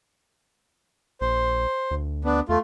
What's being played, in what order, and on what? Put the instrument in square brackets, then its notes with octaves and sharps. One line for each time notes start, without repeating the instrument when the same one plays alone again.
[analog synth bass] A#1 [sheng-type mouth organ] C5
[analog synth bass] D2
[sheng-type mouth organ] B3 D4
[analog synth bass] E2 [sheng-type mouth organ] A3 F4